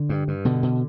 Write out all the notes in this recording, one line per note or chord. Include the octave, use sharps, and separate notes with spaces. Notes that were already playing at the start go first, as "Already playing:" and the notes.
Already playing: D3
G2
G2
B2 D3
B2